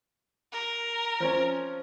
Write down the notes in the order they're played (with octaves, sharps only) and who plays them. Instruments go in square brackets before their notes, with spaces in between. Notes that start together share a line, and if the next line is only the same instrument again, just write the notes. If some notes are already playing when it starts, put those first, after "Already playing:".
[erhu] A#4
[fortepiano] F3 C4 C#4